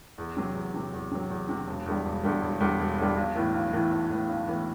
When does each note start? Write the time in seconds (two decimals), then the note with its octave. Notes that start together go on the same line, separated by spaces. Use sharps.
0.18 E2
0.37 C3 F#3
0.55 E2
0.74 C3 F#3
0.93 E2
1.12 C3 F#3
1.30 E2
1.49 C3 F#3
1.67 E1
1.86 E2 D3 G3
2.05 E1
2.23 E2 D3 G3
2.42 E1
2.60 E2 D3 G3
2.79 E1
2.98 E2 D3 G3
3.17 B1
3.35 A2 E3 B3
3.54 B1
3.73 A2 E3 B3
3.91 B1
4.11 A2 E3 B3
4.29 B1
4.48 A2 E3 B3